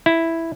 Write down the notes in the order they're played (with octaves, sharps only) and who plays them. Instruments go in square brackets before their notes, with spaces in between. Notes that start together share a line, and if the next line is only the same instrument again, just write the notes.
[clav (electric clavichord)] E4